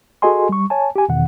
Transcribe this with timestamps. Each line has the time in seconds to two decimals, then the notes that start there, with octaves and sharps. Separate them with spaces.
0.22 F#4 G#4 A4 D#5 G#5 C6
0.49 G3 C#6
0.70 C#5 G#5 A5
0.96 G4 G#5
1.09 E2 B2 D#3 F#5